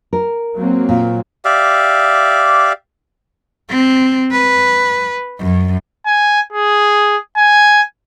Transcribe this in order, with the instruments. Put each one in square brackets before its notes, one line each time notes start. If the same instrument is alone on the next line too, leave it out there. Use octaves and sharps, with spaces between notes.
[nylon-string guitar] A#4
[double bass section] F#3 A#3 C4
[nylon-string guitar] A#2
[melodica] G4 D5 E5 F5
[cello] C4
B4
F#2
[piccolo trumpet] G#5
G#4
G#5